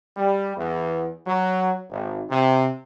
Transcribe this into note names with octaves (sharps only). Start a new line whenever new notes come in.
G3
E2
F#3
G#1
C3